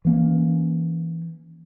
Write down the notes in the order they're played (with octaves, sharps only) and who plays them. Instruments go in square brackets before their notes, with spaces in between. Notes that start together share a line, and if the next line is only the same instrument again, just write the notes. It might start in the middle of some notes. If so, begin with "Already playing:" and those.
[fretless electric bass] E3 A#3 C#4